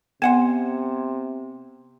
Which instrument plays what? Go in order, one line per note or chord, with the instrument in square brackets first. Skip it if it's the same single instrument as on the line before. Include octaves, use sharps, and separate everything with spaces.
[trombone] C3 [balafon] B3 [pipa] C5 F#5 G#5